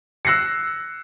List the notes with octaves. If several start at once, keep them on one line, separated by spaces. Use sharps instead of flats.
E6 F#6 A#6 C7 C#7